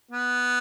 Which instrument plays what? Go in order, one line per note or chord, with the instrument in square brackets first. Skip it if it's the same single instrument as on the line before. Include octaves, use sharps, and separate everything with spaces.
[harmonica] B3